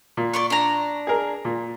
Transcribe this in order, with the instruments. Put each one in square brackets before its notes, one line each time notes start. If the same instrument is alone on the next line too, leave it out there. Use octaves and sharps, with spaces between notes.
[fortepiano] A#2
[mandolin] D5 C6 C#6
D4 A#5
[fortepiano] G#4 A#4
A#2